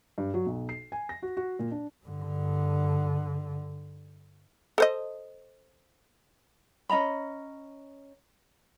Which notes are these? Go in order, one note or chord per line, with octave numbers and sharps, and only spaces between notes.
G2
F#3
B1
C7
G#5
A#6
F#4
F#4
A#2
D4
G2 D3
A4 C5 D#5
C#4 D#5 A#5 B5